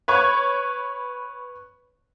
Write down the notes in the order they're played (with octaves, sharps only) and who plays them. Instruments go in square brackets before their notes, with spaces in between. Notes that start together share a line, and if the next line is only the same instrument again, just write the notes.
[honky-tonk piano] B4 C#5 C#6